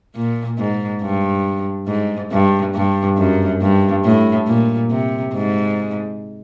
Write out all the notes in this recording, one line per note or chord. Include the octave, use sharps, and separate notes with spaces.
A#2
G#2
G2
G#2
G2
G2
F#2
G2
A2
A#2
C3
G#2